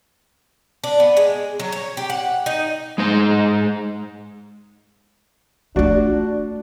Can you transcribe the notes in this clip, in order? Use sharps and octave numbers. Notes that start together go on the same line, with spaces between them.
D4
B3
G#3
F#3
C#5
G4
F#5
D#4
G#3 D#4 C5
A3 D4 F4 F#4 D5